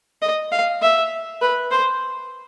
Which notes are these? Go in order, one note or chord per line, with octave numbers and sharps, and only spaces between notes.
D#5
F5
E5
B4
C5